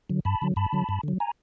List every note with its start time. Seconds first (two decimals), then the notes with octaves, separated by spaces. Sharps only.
0.10 D3 F#3
0.25 G2 A5 B5
0.42 D3 F#3
0.56 G2 A5 B5
0.72 D3 F#3
0.89 G2
1.03 D3 F#3
1.20 G#5 A#5